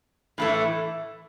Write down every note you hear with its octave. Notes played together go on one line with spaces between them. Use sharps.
A2 E3 A3 E4